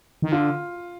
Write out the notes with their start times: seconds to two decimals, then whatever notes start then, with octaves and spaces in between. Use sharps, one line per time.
0.22 D#3
0.32 D3 F4